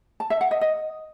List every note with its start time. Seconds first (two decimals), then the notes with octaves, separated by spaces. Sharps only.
0.20 A5
0.30 E5
0.41 F#5
0.51 D#5
0.61 D#5